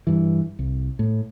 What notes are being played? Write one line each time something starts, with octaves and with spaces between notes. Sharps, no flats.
G2 E3
C2
A2